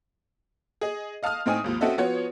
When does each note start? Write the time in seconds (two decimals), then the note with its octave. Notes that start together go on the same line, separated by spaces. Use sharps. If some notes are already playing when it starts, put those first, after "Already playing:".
0.81 G#4 D#5
1.23 D#5 F5 A5 D#6 F6
1.46 A2 C4 D#4 G#5 D#6
1.64 G#1 D#2 F3
1.81 C4 C#4 F#4 A4 D#5 E5
1.98 F3 B3 F4 F#4 C#5